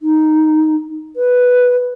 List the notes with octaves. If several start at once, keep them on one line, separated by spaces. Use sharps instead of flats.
D#4
B4